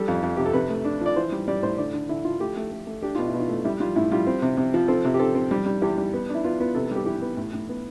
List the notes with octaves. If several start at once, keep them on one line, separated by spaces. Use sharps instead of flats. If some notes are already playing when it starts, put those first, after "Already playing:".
Already playing: G3 A4
F2
F2
C3 G4
A4
C3 B4
A3
D4
F3 D5
E3 C5
G3
G3 D5
A2 C5
D3 D5
D3
D3 E4
F3 F4
A3 G4
A3
A3
A3
D4 G4
B2 F4
E4
B2
F4
A3
G3 E4
G3 F4
A2 E4
G3 F4
C4
C3
C3
F3
C4 A4
C3
G4
C4 A4
C4
G3
G3
E2 G4
G3
B3
D4
E4
B3 F4
B3 F4
C3 A4
A4
G3 G4
E3 G4
B3
A2
A2
B3